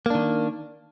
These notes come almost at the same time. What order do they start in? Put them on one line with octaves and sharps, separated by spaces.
A#3 D4 D#3